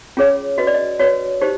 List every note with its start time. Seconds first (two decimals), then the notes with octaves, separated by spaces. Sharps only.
0.17 C#4 F4 G#4 C#5
0.58 F#4 B4 D#5
0.67 D5
0.74 D#5
0.99 F#4 B4 C#5
1.41 D#4 G4 C5